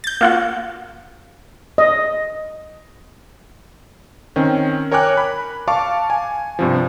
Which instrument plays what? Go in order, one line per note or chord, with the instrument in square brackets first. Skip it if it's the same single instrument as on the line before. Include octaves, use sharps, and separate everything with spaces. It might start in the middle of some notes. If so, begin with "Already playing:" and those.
[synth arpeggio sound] G6 A6
A#3 F4 F#4
[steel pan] D#5
[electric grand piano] D#3 C4 C#4
A#4 C#5 G5 G#5 D6 F#6
B5
F5 A5 C#6 D6
G#5
G2 C3 F3